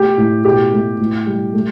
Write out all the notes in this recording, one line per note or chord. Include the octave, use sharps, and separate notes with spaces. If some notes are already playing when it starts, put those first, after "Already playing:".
Already playing: A3 G4
A2
B2 G4
A3
A2
G3
A3